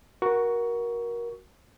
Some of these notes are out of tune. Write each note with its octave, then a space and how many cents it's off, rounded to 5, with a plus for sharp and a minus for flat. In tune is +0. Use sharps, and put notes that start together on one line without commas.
F#4 +0 A#4 +20 C#6 +15